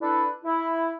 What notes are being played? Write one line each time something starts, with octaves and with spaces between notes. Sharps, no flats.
D4 E4 A4 B4
E4